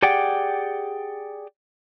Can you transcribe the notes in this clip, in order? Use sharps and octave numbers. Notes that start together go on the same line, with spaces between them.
G4 G#4 D5 F#5 G5